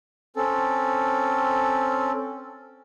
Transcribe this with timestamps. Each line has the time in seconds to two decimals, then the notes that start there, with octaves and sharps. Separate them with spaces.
0.36 C4 C#4 A4